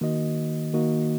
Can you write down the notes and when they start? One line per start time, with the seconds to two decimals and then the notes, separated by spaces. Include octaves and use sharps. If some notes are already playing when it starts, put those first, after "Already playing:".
0.01 D#3 A#3 F#4 D#5
0.73 D#3 A#3 F#4 D#5